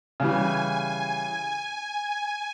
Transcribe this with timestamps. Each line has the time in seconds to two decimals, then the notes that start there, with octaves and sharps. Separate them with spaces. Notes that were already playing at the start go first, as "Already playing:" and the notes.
0.20 C#3 E3 G3 G#5
1.67 G#5